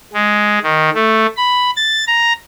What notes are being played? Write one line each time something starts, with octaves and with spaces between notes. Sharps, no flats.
G#3
D#3
A3
B5
A6
A#5